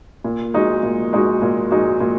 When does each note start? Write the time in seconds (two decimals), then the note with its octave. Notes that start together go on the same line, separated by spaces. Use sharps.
0.24 A#2
0.54 G#3 D#4 F#4
0.83 A#2
1.13 G#3 D#4 F#4
1.42 A#2
1.71 G#3 D#4 F#4
2.00 A#2